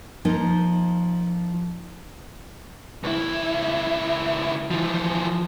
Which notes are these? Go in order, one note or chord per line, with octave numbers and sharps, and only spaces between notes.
F3 A#3 D#4
C#2 E4
E3 F3